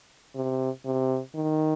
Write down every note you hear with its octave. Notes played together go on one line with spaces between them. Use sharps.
C3
C3
D#3